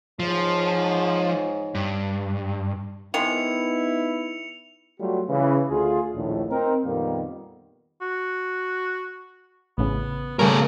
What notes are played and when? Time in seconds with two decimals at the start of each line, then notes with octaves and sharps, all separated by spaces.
0.19 G#2 F3 C#5
1.75 G2
3.14 D#3 F3 G#3 B3 D#4 E4 C#7 F7
5.00 F#3 G3 A3 F4 F#4
5.29 C#3 E3 B4
5.70 D2 F4 G#4
6.15 A#1 D#2 A2
6.50 C4 D#4 A#4
6.84 F2 A#2 D#3 G3 A#3 B3
8.01 F#4
9.78 A1 A2 C#3 B3
10.39 C#3 G3 A3 A#4 C#5